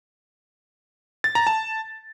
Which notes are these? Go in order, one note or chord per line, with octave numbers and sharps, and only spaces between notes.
A6
A#5
A5